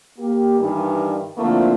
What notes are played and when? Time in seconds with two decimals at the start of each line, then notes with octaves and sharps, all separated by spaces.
0.18 A#3 G4
0.59 G2 D#3 E3 G3
1.38 D3 F3 A3 A#3 C4 E4